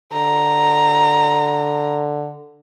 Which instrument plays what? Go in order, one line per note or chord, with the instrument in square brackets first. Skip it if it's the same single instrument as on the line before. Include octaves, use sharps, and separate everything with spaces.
[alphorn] D3 [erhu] A#5